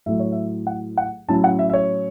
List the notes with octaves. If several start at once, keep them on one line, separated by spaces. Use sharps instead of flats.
A2 F#3 A3 E5
C#5
E5
F#5
F#5
A2 F#3 C#4 E4 A5
F#5
E5
E5
C#5